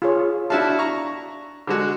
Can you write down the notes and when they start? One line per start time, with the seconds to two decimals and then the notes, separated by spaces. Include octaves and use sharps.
0.02 F4 G#4 C#5
0.50 D4 E4 F#4 E5 F5 A5
0.79 A#5 C#6
1.67 D3 G#3 F#4